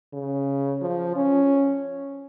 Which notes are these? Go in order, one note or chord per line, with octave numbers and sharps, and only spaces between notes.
C#3
F3
C#4